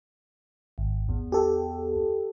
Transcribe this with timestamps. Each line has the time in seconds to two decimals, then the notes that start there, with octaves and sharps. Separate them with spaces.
0.78 G#1
1.09 E2
1.32 G4 A4